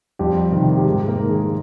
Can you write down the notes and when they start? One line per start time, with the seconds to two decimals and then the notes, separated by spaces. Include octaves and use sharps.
0.19 F2 G3 G4
0.52 C3 D#3
0.77 G4
0.85 G#2 G#3 G#4
1.08 A#3 A#4
1.19 D#3
1.30 G#3 G#4
1.42 G#4